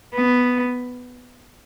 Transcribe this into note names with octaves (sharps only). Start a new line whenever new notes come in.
B3